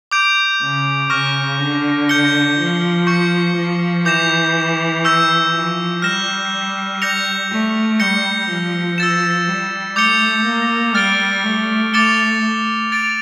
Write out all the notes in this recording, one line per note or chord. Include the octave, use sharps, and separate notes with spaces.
D6 G6 D7
C#3
C#3 C#6 F6 A#6
D3
G6 C#7 G7
F3
C#6 G6 C#7
F3
E3 D6 G6 A#6 E7
C#6 E6 G6 A#6
F3
G3 F6 A#6 E7 G7
G6 A#6 C#7 F7
A3
G3 G6 A#6 C#7 G7
F3
E6 A6 E7
G3
A3 D6 G6 C#7 G7
A#3
G3 F6 A6 D7 G7
A3
A3 D6 A6 C#7 E7 G7
A6 D7 F7